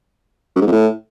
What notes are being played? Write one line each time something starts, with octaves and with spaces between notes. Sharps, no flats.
F#2
G#2
F2
A2